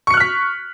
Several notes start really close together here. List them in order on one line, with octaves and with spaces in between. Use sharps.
C#6 C#7 F#6 F6 B6